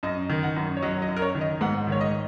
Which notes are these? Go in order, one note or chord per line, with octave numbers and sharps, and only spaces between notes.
F#2 D#5
D#3
F#5
F#2
C#5
F#3 D#5
D#5
F#2
A#4
C#5
D#3
D#5
G#2 F#5
D#3 C#5
D#5